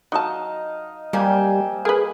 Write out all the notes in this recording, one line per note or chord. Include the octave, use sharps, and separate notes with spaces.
F#3 D#4 D#5 F5 A5
G3 A#3 C4 G#5
G#4 A#4 B4